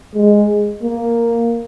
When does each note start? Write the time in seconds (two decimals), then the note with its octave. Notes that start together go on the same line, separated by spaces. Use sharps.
0.15 G#3
0.83 A#3